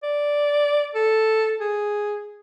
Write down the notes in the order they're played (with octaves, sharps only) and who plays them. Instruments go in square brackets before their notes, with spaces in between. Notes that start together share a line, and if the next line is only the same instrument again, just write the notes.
[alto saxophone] D5
A4
G#4